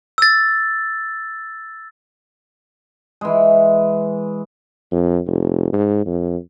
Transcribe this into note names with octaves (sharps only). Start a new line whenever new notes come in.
E6 A6
E3 G#3
F2
F1
G#2
F2